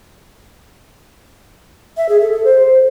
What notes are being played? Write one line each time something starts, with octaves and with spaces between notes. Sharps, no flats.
E5
G#4
A4
A4
C5